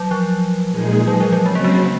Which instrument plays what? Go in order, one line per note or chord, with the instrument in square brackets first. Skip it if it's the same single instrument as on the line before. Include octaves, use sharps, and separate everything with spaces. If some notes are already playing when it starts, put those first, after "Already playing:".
Already playing: [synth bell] F#3
F3
[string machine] A#2 G#3 D#4 G#4
[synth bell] F#3
F3
F#3
[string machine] C#3 F#3 C4 [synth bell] G#3
[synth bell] A#3
G#3
G#3